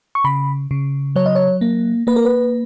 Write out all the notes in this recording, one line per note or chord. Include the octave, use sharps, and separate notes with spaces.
C#6
C#3 B5
C#3
F#3 C#5
D#5
C#5
A#3
A#3 B4
A#4
B4